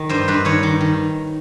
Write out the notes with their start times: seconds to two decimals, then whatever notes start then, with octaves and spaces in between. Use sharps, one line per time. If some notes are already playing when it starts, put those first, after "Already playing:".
Already playing: D#3
0.09 G2 C5
0.28 G2 B4
0.45 D#3 C#5
0.63 D#3
0.81 D#3